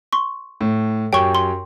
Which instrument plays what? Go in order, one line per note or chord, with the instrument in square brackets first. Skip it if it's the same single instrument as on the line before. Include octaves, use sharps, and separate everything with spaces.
[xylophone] C6 C#6
[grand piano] A2
[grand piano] F#2 G4 C#5 [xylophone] G5 C#6 G7
[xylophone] C6